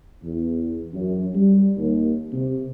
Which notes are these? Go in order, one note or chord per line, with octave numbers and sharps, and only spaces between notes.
E2
F#2
G3
D#2
C3